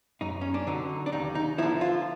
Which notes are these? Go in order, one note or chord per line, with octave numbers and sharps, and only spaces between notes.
F#2 D#4
C#4
D4
D3 F#3 D#4
D4
D#2 D#4
D#4
D3 F3 E4
F4